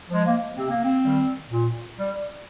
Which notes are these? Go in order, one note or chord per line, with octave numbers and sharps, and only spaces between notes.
F3 G#3
A#3
C3 C4
A#3
C4
D#3 G3
A#2
G3